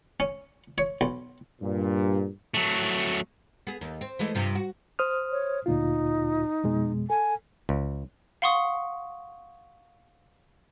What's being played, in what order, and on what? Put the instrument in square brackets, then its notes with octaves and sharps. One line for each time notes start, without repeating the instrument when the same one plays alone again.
[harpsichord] C#4
C#5
B1
[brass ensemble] G2 A#2
[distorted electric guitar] F#3 A3
[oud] B3 G#4
D#2
C4
E3 G#3 A3
G2 C3 F3
F#4
[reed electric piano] C5 D#6 F6
[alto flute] C#5
[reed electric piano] D2 A#2 F4 [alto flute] D#4
[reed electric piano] F2 B2 G#3
[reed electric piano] A4 [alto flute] G#5
[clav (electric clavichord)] C#2
[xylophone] F5 F#5 C6 C#6 D#6